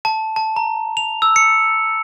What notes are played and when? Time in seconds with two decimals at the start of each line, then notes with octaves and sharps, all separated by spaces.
0.05 A5
0.36 A5
0.56 A#5
0.97 F7
1.22 E6
1.36 C#7